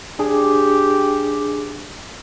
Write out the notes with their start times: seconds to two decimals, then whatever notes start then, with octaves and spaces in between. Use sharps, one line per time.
0.19 D4 G4 G#4